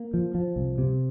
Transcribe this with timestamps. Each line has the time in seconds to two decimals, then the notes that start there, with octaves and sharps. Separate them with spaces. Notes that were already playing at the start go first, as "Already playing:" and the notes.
Already playing: A#3
0.14 F3
0.35 F3
0.56 C2
0.78 C3